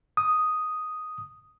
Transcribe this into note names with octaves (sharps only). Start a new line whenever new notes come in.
D#6